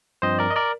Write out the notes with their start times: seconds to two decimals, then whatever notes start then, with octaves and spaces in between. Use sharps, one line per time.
0.22 G2 F3 C4 C5 D#5
0.39 A#4 D5
0.50 D#5
0.56 A#4 D5